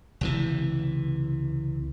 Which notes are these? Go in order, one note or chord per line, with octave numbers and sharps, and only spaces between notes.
C#2 C3 E3